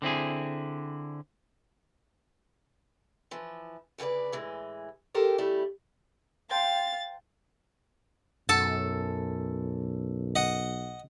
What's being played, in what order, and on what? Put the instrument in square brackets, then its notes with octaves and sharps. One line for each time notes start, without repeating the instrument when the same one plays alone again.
[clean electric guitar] D3 C4 E4 G#4
[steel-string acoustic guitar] E3 F3
D2 C#3 F#4 B4 D5
A2 E3 G#3
G4 A4 A#4 C5 G5
C#3 G3 A3 E4
[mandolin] C5 G5 A5 [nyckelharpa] F5 [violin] A6
[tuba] B1 [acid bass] F#2 [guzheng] A4 A5
[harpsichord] D#5 F#5